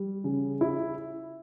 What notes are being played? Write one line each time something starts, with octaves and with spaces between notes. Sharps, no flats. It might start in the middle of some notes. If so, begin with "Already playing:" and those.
Already playing: G3
C#3
E4